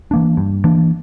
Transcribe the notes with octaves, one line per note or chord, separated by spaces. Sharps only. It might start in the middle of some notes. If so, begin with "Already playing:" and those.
E3 A#3 D4
G2
E3 A#3 D4